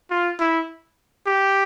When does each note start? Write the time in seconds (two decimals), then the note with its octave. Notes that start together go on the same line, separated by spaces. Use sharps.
0.11 F4
0.40 E4
1.26 G4